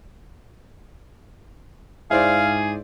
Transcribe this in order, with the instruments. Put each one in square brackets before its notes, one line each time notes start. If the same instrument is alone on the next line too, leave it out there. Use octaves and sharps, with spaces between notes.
[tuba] G#2 [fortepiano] E4 C5 D5 [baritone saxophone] G#4 [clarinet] F5